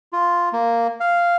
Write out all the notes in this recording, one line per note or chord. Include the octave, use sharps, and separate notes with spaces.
F4
A#3
F5